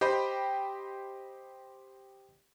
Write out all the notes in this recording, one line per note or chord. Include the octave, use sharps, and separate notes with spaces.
G4 C5 D#5 G5 B5